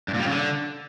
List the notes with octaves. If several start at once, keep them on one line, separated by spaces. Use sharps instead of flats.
G2
A#2
G3
C#3
D3